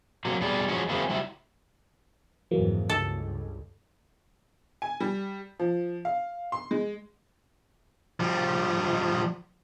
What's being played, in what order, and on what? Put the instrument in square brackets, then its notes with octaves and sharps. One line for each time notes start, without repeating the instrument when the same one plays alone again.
[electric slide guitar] C3 F#3 A#3 F#4
B2 G3 G#4 D5
F3 F#3 G#3 C#4 F#4
E3 F#3 A#3 C4 E4 G#4
G3 E4 F#4
[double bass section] F2 G#2 C3 [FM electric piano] E3 F#3 A#3
[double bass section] C#2 G2 [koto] A4
[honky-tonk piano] G#5
G3
F3
F5
C6
G#3
[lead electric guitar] F3 G3